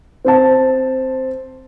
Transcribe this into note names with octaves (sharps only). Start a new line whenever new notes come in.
C4 C5 A5